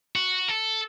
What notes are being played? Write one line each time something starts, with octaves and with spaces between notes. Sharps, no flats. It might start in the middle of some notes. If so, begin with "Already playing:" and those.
F#4
A4